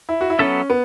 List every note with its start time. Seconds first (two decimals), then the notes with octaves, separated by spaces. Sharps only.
0.09 E4
0.21 F#4
0.30 E4
0.39 F#3 B3 C#4 A4 E5
0.70 B3